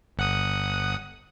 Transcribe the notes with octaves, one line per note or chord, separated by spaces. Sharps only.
G1 F#5 D#6